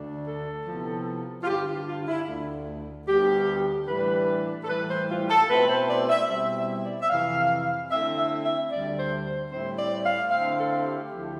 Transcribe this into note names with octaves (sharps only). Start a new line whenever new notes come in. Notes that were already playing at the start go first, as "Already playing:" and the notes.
Already playing: D2 D3 A3 D4
A4
C3 F3 B3 E4
F4
G2 D3 G3 G4
F4
F4
E4
D2 D3 A3
D2 D3 G3 B3 G4
A2 E3 G3 D4 B4
A4
A2 E3 G3 B4
C5
F4
A4
B2 A3 C4 E4 B4
C5
D5
E5
B2 G3 C4 E4 E5
E5
D5
E5
F2 C3 E3 F5
D3 A3 C4 E4 E5
E5
E5
D2 D3 G3 D5
C5
C5
A2 G3 C4 E4 C5
D5
F5
D3 A3 C4 E4 F5
A4
G4
D2 D3 F3 A3 E4